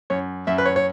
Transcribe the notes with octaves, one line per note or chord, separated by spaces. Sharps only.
F#2 C#5
F#2 E5
B4
C#5
C#5